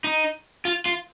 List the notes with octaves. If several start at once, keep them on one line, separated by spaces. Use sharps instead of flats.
D#4
F4
F4